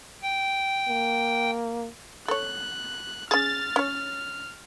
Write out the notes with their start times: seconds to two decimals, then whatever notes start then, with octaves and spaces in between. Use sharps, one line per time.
0.22 G5
0.88 A#3
2.28 A4 C#5 F#6
3.31 C#4 G#4 F6 A6
3.76 C#4 C#5